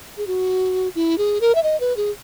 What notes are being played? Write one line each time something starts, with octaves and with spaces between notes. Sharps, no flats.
G#4
F#4
E4
G#4
A#4
E5
D#5
B4
G#4